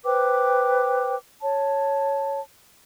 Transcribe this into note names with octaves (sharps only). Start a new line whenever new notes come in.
B4 C5 G5 D6
C#5 A5